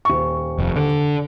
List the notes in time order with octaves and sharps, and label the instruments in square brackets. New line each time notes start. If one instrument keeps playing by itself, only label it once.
[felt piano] D#1 C#6
[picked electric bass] F1
D3